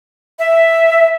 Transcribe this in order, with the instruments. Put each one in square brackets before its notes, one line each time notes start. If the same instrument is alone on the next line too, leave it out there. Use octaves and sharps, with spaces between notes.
[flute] E5